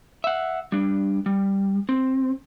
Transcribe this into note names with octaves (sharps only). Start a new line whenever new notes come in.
E5 F#5
G3 D4
G3
C4